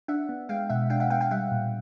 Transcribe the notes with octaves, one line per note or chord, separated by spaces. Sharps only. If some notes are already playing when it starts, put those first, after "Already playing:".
D4 E5 F#5
B3
G#3 F5 G5
B2 E5 F#5
D4 F5 G5
E5 F#5
B3 F5 G5
F5 G5
G3 E5 F#5
A#2